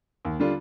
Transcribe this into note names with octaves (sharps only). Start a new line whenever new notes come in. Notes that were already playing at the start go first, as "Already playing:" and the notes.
D#2
D3 G3 D4 F4